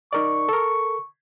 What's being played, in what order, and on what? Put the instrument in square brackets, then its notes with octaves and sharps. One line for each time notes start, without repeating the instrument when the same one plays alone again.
[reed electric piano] D#4 A#4 D5 [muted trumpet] C#6
[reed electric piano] A4 A#4